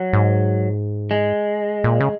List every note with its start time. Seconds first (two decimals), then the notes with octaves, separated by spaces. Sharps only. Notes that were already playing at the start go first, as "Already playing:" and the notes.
Already playing: F#3
0.13 G#2
1.11 G#3
1.84 A#2
2.00 C#3